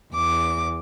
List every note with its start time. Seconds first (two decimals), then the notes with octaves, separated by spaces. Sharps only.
0.13 E2 D6